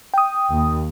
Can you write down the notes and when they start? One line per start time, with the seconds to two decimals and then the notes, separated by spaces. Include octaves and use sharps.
0.14 G5 D#6
0.51 D#2